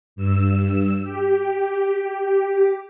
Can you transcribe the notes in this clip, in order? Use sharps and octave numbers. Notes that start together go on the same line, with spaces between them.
G2 E6
G4